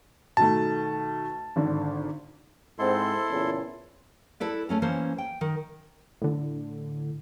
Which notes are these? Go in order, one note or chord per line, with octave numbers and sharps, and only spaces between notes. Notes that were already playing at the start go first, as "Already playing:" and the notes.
B2 D#3 A3 A5
G#1 D3
G#2 C4 E4 A4 C6
E2 A#2 C#3
E4 A4 B4 D5
A3 C#4 A#4
E3 A#3 C#4 C5
G5
D#3
A2 D3